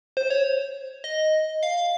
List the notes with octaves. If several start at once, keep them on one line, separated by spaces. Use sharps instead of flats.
C5
C#5
D#5
F5